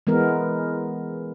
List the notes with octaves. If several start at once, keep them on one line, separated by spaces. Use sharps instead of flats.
E3 G#3 B3 A#4